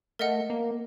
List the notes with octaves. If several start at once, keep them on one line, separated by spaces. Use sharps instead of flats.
A3 A#4 D#5 F#5
A#3